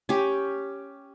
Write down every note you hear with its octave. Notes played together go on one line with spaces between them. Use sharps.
C#4 G4